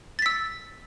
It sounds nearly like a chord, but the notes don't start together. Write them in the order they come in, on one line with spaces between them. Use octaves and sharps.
A6 B6 E6